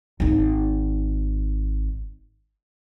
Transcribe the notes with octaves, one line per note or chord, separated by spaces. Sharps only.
G#1 D#4